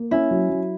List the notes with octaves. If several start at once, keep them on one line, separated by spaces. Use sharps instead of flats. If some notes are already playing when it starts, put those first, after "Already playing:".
Already playing: A#3
C#4 E4
F#3
F#3